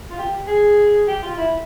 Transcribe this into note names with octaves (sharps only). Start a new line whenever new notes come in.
F4
G4
G#4
G4
F4
E4